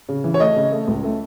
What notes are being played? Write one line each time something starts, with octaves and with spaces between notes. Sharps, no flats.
C#3
E3
C#5
A3 D#5
C#3
A3
C#2
A3